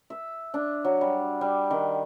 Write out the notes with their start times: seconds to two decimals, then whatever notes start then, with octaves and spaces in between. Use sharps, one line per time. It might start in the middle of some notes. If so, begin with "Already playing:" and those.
0.10 E5
0.54 D4
0.85 F#3
1.01 G3
1.41 G3
1.71 D#3